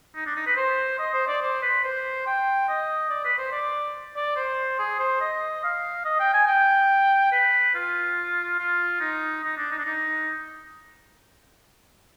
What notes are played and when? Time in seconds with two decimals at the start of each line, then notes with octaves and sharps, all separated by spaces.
0.15 D#4
0.26 D4
0.36 D#4
0.46 B4
0.57 C5
0.99 D#5
1.14 C5
1.27 D5
1.42 C5
1.62 B4
1.84 C5
2.26 G5
2.68 D#5
3.10 D5
3.25 B4
3.38 C5
3.52 D5
4.16 D5
4.36 C5
4.79 G#4
4.99 C5
5.21 D#5
5.64 F5
6.05 D#5
6.19 G5
6.34 G#5
6.47 G5
7.32 B4
7.74 F4
8.59 F4
9.00 D#4
9.43 D#4
9.57 D4
9.71 D#4
9.78 D4
9.85 D#4